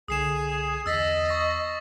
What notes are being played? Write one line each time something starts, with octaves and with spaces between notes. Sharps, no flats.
C2 D3 G#4 D#6 C7 E7
E2 D#5 E6 A6 B6
C#6 A#6